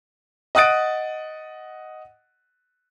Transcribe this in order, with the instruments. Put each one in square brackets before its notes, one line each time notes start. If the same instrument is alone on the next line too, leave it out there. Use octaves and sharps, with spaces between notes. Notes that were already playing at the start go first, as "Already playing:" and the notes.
[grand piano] D#5 F#5 D#6 F#6 A6 D7